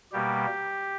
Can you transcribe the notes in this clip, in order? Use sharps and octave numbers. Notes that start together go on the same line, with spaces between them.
B2 G3 A#3 G4